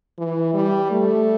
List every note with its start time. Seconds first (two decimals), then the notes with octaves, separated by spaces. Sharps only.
0.18 E3
0.54 G3
0.91 A3